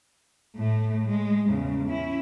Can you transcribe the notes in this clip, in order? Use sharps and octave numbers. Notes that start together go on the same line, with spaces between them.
A2 A3
G#3
E2 C#3
C#4 E4